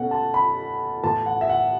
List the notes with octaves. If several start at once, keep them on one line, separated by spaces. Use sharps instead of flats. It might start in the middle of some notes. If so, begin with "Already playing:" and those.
Already playing: B2 A3 C#4 F#5
A5
B5
A2 E3 B3 A5
F#5
E5
F#5